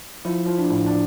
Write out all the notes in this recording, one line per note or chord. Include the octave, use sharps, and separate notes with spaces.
F3 E4
F3
D4
A2
D4